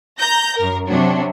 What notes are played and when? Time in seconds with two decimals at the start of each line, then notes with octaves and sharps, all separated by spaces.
0.20 A#5 G6 A#6
0.56 F#2 A#4
0.88 C3 F#3 D4